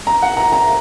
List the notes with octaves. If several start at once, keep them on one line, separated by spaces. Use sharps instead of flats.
A#5
F#5
A#5
A#5